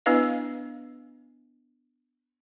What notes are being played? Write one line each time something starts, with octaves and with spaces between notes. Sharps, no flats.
B3 D4 E4 B4 D#5 F5